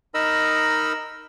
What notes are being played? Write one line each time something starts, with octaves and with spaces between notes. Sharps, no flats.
D#4 A#4 D#5 B5 E6